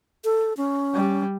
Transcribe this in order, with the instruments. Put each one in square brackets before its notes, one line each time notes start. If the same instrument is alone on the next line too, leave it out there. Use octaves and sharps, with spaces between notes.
[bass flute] A4
C#4
[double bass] G3